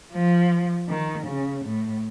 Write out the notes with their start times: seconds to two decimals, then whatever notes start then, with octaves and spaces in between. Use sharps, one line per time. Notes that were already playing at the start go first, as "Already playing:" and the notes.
0.12 F3
0.88 D#3
1.27 C#3
1.64 A2